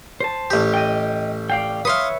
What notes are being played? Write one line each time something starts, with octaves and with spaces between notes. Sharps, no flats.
C5 A5
A1 G4
D#5 G5
D5 F5 G5
B4 C#5 E5 F5 C6 D#6